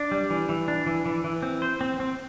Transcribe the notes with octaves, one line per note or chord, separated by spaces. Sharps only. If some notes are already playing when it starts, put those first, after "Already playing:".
Already playing: D4
G3
E3
E3
D4
E3
E3
E3
C4
C5
C4
C4